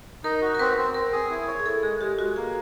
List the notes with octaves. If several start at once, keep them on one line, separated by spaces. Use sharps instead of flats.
D#4 A#4
F#4
A#4
C4 B4
C4
C4 A#4
G#4
E4
C#5
G#4
E4 A4
G#3 G#4
G#3 G4
G#3 F#4
A#3 G#4